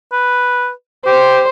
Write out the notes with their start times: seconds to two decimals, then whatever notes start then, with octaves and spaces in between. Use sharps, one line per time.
0.12 B4
1.06 G4 C5